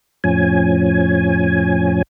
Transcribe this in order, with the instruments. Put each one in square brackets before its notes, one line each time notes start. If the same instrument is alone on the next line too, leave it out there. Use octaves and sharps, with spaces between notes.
[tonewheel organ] F2 A2 F3 C#4 G#5